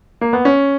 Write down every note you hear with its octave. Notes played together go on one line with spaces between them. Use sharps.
A#3
B3
C#4